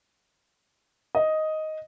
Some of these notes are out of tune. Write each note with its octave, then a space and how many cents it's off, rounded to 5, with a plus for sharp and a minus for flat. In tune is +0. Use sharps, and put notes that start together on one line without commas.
D#5 +5